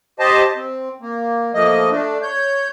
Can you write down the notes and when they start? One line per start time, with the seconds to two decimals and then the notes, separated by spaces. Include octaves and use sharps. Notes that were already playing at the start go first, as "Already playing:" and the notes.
0.19 G4 C5 D#5 A5
0.56 C4
1.01 A#3
1.54 F3 A3 A#3 D#5
1.91 A3 D4
2.23 C#5 G6